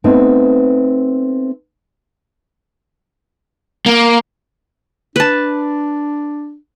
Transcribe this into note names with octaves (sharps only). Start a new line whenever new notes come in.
A3 B3 C4 D#4
A#3
D4 B4 A5